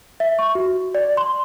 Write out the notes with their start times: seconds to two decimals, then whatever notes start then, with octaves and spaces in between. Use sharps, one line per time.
0.20 E5
0.39 C#6
0.55 F#4
0.95 D5
1.17 C6